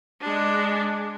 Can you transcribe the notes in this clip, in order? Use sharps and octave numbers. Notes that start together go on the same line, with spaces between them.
G#3 D4